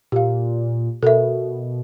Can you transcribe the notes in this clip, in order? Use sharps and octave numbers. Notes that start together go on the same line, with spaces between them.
A#2 G4 F5
B2 A4 A#4 E5